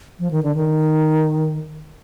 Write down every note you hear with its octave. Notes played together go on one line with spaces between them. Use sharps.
F3
D#3
D3
D#3